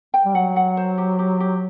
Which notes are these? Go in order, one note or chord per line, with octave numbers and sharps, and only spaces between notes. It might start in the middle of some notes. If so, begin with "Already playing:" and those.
G5
G3
F#3 F#5
F#5
C5
G4
G4
G4